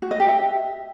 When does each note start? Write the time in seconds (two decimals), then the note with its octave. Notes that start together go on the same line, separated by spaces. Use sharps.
0.02 F#4
0.11 D#5
0.20 G4
0.28 E5